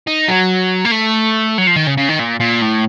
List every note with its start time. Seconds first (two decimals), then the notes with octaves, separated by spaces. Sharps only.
0.07 D#4
0.28 F#3
0.85 A#3
0.91 A3
1.58 F#3
1.67 F3
1.76 D#3
1.87 C#3
1.97 C#3
2.09 D#3
2.19 A#2
2.40 A#2
2.61 A2